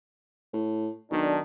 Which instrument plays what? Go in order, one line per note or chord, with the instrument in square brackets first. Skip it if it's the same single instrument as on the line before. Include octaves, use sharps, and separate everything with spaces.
[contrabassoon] A2
[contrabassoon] B1 [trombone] D#3 [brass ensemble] D4